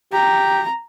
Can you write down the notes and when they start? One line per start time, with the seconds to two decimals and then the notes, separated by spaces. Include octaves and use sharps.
0.13 G4 A#5